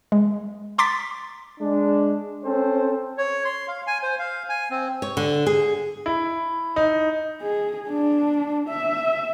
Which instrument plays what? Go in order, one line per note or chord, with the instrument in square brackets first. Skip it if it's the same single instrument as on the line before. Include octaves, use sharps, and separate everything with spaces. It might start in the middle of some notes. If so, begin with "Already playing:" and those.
[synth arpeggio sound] G#3
A#5 C6 D6 A6 B6
[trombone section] G#3 D4
C4 C#4 A4 C5
[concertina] C#5
C6
F5
G#5
C5
F5
G#5
C4
[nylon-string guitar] C#5
D3
G#4
[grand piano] E4
D#4
[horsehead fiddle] G#4
D4
E5